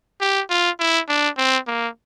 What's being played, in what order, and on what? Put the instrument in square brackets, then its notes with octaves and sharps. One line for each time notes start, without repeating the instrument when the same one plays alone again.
[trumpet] G4
F4
E4
D4
C4
A#3